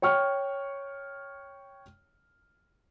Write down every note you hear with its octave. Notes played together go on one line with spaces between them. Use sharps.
C#5 G5 C#6 F6